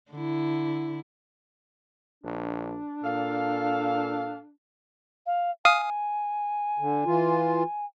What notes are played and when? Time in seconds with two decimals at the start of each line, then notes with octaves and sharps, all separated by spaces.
0.12 D3 E4
2.24 A#1 D4
3.03 A#2 A4 F5
5.26 F5
5.65 F5 G#5 D#6
6.79 D3
7.05 E3 F4